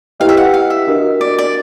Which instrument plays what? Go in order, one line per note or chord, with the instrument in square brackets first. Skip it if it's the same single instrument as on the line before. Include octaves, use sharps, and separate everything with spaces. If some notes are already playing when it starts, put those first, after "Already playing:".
[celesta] E4 G4 B4 D#5 G5 [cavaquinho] F5
[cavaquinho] E5
F#5
F5
E5
[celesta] D4 F#4 A#4 D#5
[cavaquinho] D5
D5